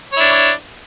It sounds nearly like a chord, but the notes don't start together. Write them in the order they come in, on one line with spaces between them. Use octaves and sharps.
C#5 E4 D4